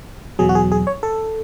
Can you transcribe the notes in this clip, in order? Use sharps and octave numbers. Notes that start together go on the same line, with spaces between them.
E2 B2 F#3 G#4
F#4
G#4
G#4
C#5
A4